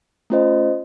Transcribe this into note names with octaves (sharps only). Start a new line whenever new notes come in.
A3 C#4 F4 C5 D#5